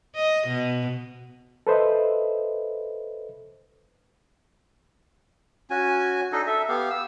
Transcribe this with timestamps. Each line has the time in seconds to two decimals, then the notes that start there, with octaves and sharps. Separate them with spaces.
0.15 D#5
0.47 B2
1.67 A4 B4 C5 D#5 E5
5.70 C#4 F#4 G#5
6.32 D4 D#4 A4 D#5
6.47 A4 E5
6.69 B3 G4 F5
6.90 E6